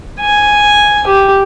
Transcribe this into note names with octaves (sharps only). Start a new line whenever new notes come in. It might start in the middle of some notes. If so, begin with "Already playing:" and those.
G#5
G4